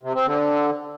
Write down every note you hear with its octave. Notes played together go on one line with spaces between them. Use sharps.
C3
C4
D3